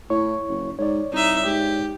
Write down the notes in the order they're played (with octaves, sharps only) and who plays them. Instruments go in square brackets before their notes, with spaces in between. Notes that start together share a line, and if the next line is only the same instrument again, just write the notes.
[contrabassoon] A2 [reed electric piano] E4 C#5 C#6
[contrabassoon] F#1
[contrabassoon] G#2 [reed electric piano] C#5 D5
[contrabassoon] C2 [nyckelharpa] D#4 E5
[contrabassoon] G#2 [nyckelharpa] G4